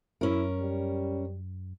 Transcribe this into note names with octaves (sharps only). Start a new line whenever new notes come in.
F#2 C#4 E4 A#4
G3